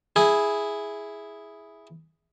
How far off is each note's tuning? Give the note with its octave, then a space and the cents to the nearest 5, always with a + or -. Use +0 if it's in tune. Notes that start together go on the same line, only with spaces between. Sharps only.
E4 -5 G#4 +0